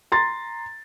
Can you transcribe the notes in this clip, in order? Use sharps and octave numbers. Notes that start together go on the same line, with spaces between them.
A#5 C6 A6